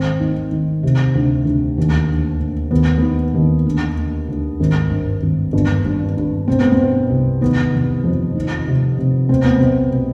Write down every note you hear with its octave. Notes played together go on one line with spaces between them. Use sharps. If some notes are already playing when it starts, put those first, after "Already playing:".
Already playing: G#1 C4
D#3
D#3
C3
D2
D2
D#2
D3
D3
D#2 B3
D#3 B3
D#2
D3
D3
D2
G#1
G2
G#1
G1
G2
G2
B2 C4
B3
C4
B2
C2
D#3 B3
F1
F2
D#3
C3
C3
B2 C4
B3
B1 C4
B2